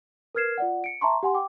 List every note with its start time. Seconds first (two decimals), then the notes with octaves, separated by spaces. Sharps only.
0.35 A#4 B4 F6 G#6 C7 E7
0.58 F4 D5 F#5
0.84 C#7 D7
1.01 E5 A5 A#5 C6 C#6
1.23 G4 F#5 G#5 C6
1.35 G5 D6